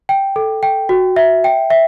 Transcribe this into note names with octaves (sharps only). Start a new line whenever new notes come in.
G5
A4
G5
F#4
E5
G5
E5